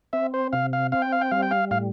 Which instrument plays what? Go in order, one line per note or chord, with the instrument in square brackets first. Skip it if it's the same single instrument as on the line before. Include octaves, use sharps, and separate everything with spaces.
[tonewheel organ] C4 [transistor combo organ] E5
[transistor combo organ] C5
[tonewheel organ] C3 [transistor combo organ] F5
[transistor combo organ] F5
[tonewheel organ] C4 [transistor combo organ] F5
[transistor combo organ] G5
F5
G5
[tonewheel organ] G3 [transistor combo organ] F5
[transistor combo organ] G5
F5
[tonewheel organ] A2 [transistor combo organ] F5